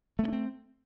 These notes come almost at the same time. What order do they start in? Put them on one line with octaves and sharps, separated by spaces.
A3 B3 D4 C4